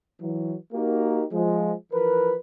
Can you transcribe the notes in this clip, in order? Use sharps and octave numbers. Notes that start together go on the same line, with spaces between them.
E3 F#3
A#3 D#4 F#4 G4 A#4
F3 G#3
E3 F3 A#4 B4